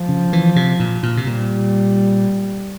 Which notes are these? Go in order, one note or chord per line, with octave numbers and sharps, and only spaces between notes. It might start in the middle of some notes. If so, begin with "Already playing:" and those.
Already playing: F3
C#3
E3
C3
A#2
A#2
C3
A#2 G3